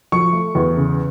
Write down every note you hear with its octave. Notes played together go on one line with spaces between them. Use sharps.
F3 C#6
A3
E2
C#3